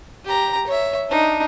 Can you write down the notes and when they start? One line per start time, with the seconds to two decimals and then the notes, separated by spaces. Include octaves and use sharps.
0.25 G4 A#5
0.67 C#5 E5
1.09 D4 D#4